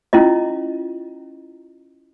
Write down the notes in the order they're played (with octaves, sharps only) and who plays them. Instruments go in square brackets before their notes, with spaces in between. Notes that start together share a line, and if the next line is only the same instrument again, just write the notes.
[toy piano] C#4 E4 F4 D#5